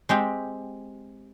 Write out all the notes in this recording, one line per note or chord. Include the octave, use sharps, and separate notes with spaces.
G#3 C4 G4